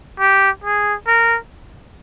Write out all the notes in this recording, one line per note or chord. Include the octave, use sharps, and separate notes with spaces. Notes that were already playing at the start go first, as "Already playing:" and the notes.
G4
G#4
A#4